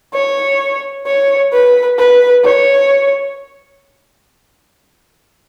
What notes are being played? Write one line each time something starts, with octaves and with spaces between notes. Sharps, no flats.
C#5
C#5
B4
B4
C#5